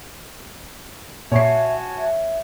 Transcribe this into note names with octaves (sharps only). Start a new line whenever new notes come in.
A#2 F#4 C#5 E5 G#5 A5 C#6 C7
E5